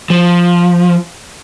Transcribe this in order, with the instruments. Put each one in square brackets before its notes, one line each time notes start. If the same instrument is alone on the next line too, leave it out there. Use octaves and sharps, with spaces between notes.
[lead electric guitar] F3